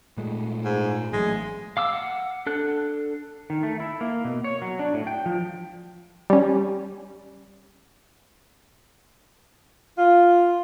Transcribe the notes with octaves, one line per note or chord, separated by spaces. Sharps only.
A#2 G#3 A3
G#2
A1 F#3 G#3 A3
F5 D6 E6
F#5
D4 A4 F#6
D#3
A3
E4
A#3
B2
C#5
F#3
D4
A2
G5
F3
G3 C#4
F4